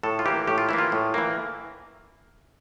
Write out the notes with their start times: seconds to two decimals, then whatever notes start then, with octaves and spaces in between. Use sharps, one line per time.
0.03 A2 A4
0.19 F4
0.26 E3 A#3 G4
0.47 A2 G4
0.58 F4
0.69 E3 A#3 E4
0.78 F4
0.92 A2
1.14 E3 A#3